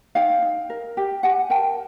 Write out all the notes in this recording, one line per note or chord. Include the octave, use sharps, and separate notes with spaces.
D#4 F5 G5
D#4
A#4
G4
G4 F#5 G#5
A#4 G5 A5